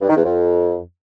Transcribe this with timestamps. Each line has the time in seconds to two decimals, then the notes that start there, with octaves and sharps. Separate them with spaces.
0.02 G2
0.09 D#3
0.17 E2
0.24 F2